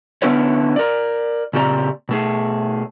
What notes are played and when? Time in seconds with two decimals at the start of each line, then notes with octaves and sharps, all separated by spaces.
0.22 D3 B3 C#4 E4 B4 C#5
0.76 A#4 D5
1.53 A#2 C#3 C4 G4 D5 A#5
2.09 B2 A3 G#4